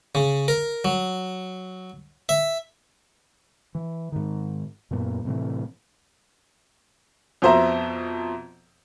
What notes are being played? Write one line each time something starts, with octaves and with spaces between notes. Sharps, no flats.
C#3
A#4
F#3
E5
E3
G#2 D#3
F#2 A#2 A#3 B3
A2 C3 E3 A3
F2 B2 C5 E5 A#5